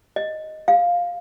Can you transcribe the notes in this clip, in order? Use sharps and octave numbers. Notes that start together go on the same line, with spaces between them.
D#5
F5